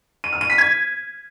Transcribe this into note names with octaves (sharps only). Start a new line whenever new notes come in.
D#7
F6
D#7
B6
G#6